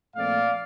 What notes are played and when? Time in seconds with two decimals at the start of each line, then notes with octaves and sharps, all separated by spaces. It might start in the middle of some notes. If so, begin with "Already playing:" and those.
0.16 A#2 F3 A3 C4 D5 F5